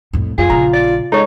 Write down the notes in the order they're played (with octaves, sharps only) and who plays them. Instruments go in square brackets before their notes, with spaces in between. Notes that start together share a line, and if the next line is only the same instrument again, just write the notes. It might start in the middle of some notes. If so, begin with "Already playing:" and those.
[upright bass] F2 A2
[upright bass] F#2 [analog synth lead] F4 [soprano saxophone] G#4
[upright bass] A#1 C#3 [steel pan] A#5
[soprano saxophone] D5
[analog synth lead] G#3 [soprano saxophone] D#4 [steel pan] A4 C#5